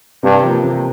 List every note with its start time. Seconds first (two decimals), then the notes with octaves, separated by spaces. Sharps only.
0.22 G2 C3
0.43 F3 A#3
0.63 C3